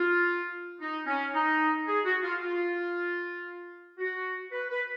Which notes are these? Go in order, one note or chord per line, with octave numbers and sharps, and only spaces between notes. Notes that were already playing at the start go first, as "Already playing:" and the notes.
Already playing: F4
D#4
C#4
D#4
G#4
F#4
F4
F4
F#4
B4
B4